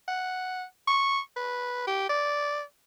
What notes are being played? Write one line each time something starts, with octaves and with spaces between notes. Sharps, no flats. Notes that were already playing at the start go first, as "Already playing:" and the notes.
F#5
C#6
B4
G4
D5